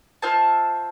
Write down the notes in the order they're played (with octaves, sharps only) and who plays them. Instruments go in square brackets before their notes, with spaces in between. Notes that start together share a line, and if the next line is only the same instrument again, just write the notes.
[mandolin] F4 C5 E5 A5